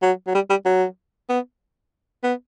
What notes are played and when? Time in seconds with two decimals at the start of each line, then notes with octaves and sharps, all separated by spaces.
0.02 F#3
0.27 F#3
0.35 G3
0.50 G3
0.65 F#3
1.29 B3
2.24 B3